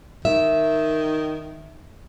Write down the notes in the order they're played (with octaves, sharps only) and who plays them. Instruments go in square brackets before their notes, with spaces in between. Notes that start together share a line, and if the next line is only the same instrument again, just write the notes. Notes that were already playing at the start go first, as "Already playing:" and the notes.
[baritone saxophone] D#3 [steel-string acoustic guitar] E5